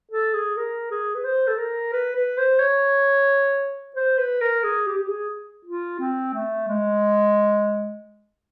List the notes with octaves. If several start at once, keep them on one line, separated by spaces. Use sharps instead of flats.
A4
G#4
A#4
G#4
B4
C5
A4
A#4
B4
B4
C5
C#5
C5
B4
A#4
G#4
G4
G4
G#4
F4
C4
A3
G#3